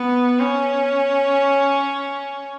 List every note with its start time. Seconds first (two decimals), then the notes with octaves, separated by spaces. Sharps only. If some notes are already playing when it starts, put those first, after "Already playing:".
Already playing: B3
0.40 C#4